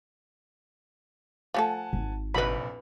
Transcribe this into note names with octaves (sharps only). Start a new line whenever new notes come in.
F3 A3 A4 F#5 G#5 A5
G#1
F1 A#1 F#3 D#4 B4 B5